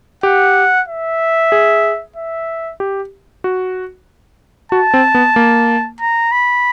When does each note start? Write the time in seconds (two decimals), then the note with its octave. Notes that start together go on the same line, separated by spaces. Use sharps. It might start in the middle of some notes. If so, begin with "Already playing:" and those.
0.23 G4 F#5
0.88 E5
1.52 G#4
2.16 E5
2.80 G4
3.44 F#4
4.72 F#4 A5
4.94 C4
5.15 B3
5.36 A#3
6.01 A#5
6.32 B5